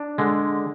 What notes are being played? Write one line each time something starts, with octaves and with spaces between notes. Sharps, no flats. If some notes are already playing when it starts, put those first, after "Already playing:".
Already playing: D4
D3 G#3